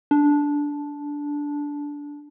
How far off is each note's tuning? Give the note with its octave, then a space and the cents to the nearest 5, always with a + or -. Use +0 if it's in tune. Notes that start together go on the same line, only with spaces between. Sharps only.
D4 -10